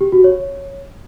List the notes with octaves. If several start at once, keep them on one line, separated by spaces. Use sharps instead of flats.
G4
F#4
C#5